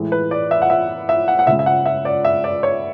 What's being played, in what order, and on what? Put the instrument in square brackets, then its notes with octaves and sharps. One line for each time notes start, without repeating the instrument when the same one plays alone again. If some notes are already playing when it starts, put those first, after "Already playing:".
Already playing: [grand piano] A2 E3 G#3
B4
D5
E5
F#5
E5
E5
F#5
F#5
C#3 G#3 E5
E5
F#5
E5
D5
E5
D5
C#5